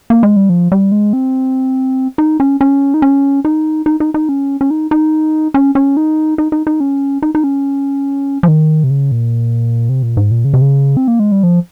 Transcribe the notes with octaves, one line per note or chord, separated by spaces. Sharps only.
A#3
G#3
G3
F3
G3
G#3
C4
D#4
C#4
C#4
D#4
C#4
D#4
D#4
D#4
D#4
C#4
C#4
D#4
D#4
C#4
C#4
D#4
D#4
D#4
D#4
C#4
D#4
D#4
C#4
F3
D#3
C3
C#3
A#2
C3
A#2
G#2
A#2
C#3
C3
C#3
C4
A#3
G#3
G3
F3